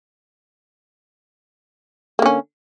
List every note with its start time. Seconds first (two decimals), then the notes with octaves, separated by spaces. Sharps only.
2.19 A#3
2.22 D3
2.26 C#4